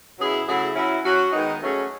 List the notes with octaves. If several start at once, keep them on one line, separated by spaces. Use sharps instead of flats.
B2 F#3 C#4 E4 G#4
C#3 F#3 A3 E4 G#4
F#3 C#4 E4
F#3 C#4 F#4
D#3 G#3 B3 D#4
F#3 A3 C#4 G#4